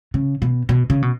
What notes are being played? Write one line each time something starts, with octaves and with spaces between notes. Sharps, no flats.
C#3
B2
B2
C#3
B2